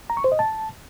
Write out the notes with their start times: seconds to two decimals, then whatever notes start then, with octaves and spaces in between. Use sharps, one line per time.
0.10 A#5
0.17 C#6
0.24 C5
0.32 D#5
0.39 A5